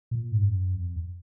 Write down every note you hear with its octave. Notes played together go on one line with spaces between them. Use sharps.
A#2
G#2
F#2
F2